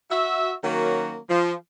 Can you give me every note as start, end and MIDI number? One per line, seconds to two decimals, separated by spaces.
0.10 0.53 66
0.10 0.53 76
0.63 1.17 51
0.63 1.17 54
0.63 1.17 58
0.63 1.17 61
0.63 1.17 66
1.29 1.53 53